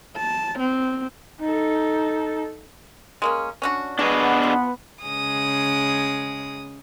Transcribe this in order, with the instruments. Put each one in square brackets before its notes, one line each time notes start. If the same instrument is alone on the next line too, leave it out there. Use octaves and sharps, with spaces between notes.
[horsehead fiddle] A5
C4
D#4 A4
[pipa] G#3 A#3 C#4
C#4 D4 F#4
[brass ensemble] B3 [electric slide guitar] D4 G#4 D#5 [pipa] F#4
[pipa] F3
[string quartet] C#3 G#3 D#6